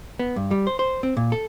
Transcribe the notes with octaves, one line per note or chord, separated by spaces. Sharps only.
B3
G2
G3
C5
C5
C4
A#2
A4